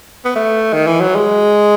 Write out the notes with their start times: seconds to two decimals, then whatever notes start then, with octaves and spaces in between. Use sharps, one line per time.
0.25 B3
0.36 A3
0.73 D#3
0.87 E3
1.01 F#3
1.15 G#3